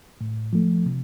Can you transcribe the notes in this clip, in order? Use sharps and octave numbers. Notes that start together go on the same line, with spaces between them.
A2
F3 A3
C3